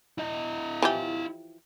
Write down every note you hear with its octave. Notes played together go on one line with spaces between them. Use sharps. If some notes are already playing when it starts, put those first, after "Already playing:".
E4 D#5
E3 F3 G4